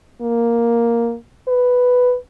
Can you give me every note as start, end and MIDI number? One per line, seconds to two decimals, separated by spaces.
0.21 1.16 58
1.48 2.15 71